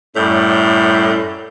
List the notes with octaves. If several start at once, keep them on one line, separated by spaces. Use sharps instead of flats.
F#2 A2 G3 G6